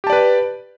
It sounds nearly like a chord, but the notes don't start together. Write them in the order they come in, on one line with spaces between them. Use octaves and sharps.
G4 A5 D5 B4